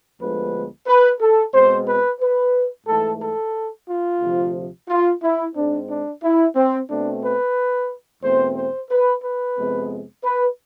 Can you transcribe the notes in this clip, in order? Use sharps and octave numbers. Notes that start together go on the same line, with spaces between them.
D2 D3 F3 G#3 B3 B4
B4
A4
B2 G#3 C4 C5
B4
B4
G#2 E3 A3 A4
A4
F4
D2 C3 F3
F4
E4
G#2 G#3 C4 D4
D4
E4
C4
B2 A3 C4 D4
B4
E2 B2 A3 C4 C5
C5
B4
B4
F2 C3 G#3 B3
B4